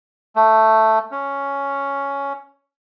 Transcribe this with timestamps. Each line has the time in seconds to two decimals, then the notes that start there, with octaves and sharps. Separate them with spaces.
0.36 A3
1.11 C#4